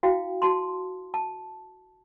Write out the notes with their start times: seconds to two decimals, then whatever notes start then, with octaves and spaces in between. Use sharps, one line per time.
0.03 E4 F#4 F5 G5
0.42 F#4 A5 C6
1.14 A5